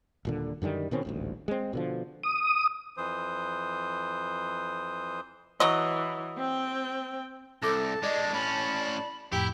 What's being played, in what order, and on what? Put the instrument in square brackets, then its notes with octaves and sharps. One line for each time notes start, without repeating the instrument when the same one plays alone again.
[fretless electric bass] D#1 A#2 D3
F#2 D3 D#3 G3
B2 D#3 C4 C#4
D#1 A1 D2
G#3 C4
B2 D3 F3
[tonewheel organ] D#6
[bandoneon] F2 E3 C5 D#6
[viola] E3 [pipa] F#3 F#4 D#5
[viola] C4 G5
[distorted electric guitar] C2 [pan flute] A4 [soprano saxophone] A5 [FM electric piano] D6 A#6
[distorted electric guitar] G#3 D4 [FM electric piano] D5 [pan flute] D#5
[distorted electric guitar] A2 C#4 [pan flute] B5
[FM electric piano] F2 A2 [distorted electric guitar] E4 [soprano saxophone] G4 [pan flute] G5